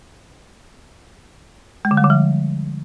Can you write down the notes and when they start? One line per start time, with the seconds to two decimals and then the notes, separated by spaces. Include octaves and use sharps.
1.85 G#3
1.91 D3
1.97 G3
2.04 D3
2.10 F3